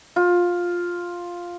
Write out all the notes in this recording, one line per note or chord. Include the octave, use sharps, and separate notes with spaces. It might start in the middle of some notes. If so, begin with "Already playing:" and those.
F4